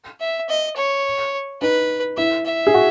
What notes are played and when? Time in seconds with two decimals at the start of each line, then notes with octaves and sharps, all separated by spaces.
0.20 E5
0.49 D#5
0.77 C#5
1.61 D#4 B4
2.17 E4 E5
2.46 E5
2.67 G#4
2.74 F#4